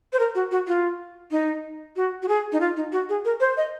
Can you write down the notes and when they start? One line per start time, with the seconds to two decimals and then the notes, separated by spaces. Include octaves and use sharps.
0.13 C5
0.19 A#4
0.35 F#4
0.51 F#4
0.67 F4
1.31 D#4
1.96 F#4
2.22 F#4
2.28 G#4
2.52 D#4
2.61 F4
2.76 D#4
2.92 F#4
3.09 G#4
3.25 A#4
3.40 C5
3.57 D#5